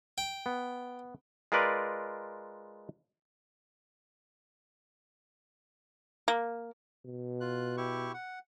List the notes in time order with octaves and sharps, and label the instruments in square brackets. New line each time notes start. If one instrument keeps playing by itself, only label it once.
[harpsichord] G5
[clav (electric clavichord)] B3
G#3 F4 A#4 B4 D5
[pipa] A#3
[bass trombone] B2
[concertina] F4 F#6
E4 G4 C#6
F#5